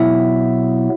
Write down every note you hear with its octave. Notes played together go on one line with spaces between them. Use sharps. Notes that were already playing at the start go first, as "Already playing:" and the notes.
Already playing: B2 F#3 B3 E4 E5